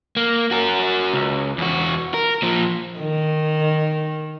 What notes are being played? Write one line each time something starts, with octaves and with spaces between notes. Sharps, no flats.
A#3
F#4 A#4
C#2
E2 F#4
A#4
A#2 F3
D#3